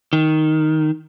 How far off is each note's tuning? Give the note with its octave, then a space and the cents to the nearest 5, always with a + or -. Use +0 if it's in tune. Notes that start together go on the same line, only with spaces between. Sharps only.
D#3 +5